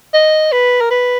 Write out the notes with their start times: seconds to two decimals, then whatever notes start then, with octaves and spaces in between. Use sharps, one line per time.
0.14 D#5
0.52 B4
0.81 A#4
0.91 B4